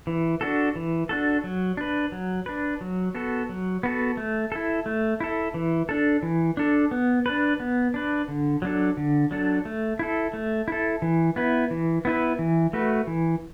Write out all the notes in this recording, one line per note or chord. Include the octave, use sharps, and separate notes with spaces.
E3
D4 F#4 A4
E3
D4 F#4 A4
F#3
D4 B4
F#3
D4 B4
F#3
B3 F#4 A4
F#3
B3 F#4 A4
A3
E4 A4
A3
E4 A4
E3
D4 A4
E3
D4 A4
B3
D4 B4
B3
D4 B4
D3
F#3 D4 A4
D3
F#3 D4 A4
A3
E4 A4
A3
E4 A4
E3
B3 E4 B4
E3
B3 E4 B4
E3
A3 F#4 B4
E3